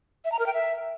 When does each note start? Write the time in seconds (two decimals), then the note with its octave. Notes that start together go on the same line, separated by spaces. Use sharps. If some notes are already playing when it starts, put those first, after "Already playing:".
0.25 E5
0.32 A#5
0.39 A#4
0.46 G5
0.53 E5